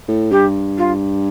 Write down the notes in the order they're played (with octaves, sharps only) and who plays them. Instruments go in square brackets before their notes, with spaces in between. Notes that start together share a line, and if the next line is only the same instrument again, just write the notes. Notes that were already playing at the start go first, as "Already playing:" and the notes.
[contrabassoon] A2
[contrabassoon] G2 [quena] G4
[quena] F4